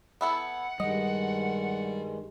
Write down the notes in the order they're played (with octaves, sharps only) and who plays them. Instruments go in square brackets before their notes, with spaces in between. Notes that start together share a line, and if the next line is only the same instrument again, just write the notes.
[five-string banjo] B3 E4 A4 [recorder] F#5
[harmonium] G2 D#3 G#3 [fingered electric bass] G3 [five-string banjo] D#5